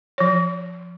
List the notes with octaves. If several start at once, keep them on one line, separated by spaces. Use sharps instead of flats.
F3 C#5